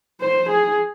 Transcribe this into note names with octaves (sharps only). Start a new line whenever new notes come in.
C5
G#4